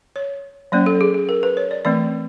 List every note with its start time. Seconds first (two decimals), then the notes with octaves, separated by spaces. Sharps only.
0.16 C#5
0.72 F#3 A#3 C#4 D5
0.86 A4
1.01 G#4
1.14 G#4
1.29 A#4
1.43 B4
1.57 C#5
1.71 D5
1.85 E3 A3 C4 D5